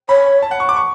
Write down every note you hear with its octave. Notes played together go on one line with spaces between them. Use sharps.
C#5 B5
A5
F#5
C#6
D6
C#6